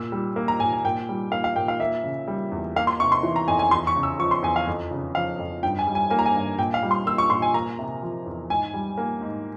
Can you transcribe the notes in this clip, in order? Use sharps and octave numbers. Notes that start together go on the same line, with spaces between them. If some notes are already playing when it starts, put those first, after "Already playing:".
Already playing: A#2 E6
G3
A#3
A#5
A#2 G#5
G#5
A#2 G5
G3
A#3 F5
F5
A#2 G5
F5
A#3 E5
C#3
G3
E2
A#3 F5
C6
C3 C#6
C6
E3
A#5
F2 G#5
G#5
E2 C6
C#6
C#3
E6
F3 C#6
C6
E2 G#5
F5
F2
C#3
F3 F5
F2
G2 G5
G#5
G3
G#5
A#3 G#5
A#5
G#5
G2
A#2 G5
F5
G3
C6
A#3 E6
C#6
A#2 C6
G#5
A#3 A#5
C3
F3
E2
G#2 G#5
G3
A#3
G#2